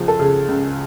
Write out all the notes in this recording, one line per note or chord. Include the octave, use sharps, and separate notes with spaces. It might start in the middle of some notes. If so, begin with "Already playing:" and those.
Already playing: C#2 F3 G#4
A4
C#3 G#4
C#2